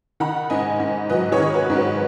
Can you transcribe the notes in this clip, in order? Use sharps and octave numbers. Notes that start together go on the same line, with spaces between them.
D#3 F#5 B5
G#2 D#5 G#5
G#2
F#3 B4 D#5
G#4 C#5
D#3
F#4 B4
G#2
F#4 B4